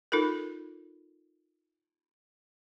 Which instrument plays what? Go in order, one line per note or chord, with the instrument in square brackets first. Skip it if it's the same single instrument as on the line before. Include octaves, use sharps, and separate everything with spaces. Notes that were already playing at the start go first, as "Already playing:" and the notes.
[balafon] D#4 F4 A4 A#4